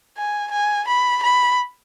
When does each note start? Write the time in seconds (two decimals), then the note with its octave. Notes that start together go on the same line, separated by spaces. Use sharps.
0.17 G#5
0.51 G#5
0.88 B5
1.23 B5